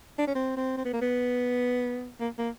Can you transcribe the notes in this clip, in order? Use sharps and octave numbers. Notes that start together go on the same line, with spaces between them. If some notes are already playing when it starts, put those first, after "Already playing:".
D4
C#4
C4
C4
C4
B3
A#3
B3
A#3
A#3